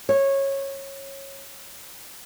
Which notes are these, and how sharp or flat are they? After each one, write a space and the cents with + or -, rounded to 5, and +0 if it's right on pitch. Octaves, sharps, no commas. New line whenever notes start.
C#5 -15